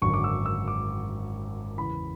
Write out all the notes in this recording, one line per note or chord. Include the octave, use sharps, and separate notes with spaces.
G#1 F#2 D3 C#6
D6
E6
E6
D6
E2 C#3 E3 B5